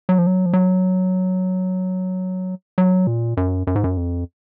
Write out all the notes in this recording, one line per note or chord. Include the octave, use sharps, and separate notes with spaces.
F#3
F3
F#3
F3
F#3
F#3
A#2
F#2
F#2
G#2
F#2
F2